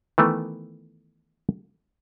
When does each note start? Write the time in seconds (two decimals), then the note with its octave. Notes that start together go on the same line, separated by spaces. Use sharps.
0.18 D#3 E3 A3 B3